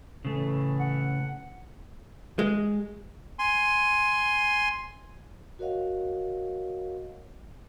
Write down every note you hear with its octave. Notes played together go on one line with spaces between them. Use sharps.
A2 C#3 E3 A3
F#5
G#3
G#5 C6
F#4 A#4 C#5 D#5 F5 F#5